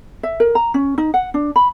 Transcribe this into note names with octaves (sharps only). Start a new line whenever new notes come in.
E5
A#4
A#5
C#4
D#4
F#5
D4
B5